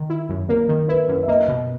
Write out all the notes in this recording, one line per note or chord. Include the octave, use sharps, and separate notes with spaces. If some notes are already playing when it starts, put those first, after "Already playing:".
Already playing: D#3
E4
F#2
A#3 A#4
D#3
E4 B4
F#2
E5
A#3 D#5
B2